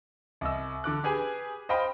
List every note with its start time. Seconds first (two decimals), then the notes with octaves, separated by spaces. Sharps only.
0.41 C2 D#5 E6
0.84 D3 D6 F#6
1.04 G4 G#4 B4 G#5
1.69 C5 D#5 F5 G5 B5